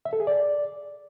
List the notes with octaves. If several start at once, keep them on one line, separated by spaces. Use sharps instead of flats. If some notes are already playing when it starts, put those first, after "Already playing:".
E5
A4
G#4
D5